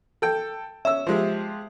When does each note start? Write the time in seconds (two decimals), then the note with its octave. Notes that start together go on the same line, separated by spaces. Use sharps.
0.22 A4 G5
0.85 C#4 E5 E6
1.07 F3 G#3 G4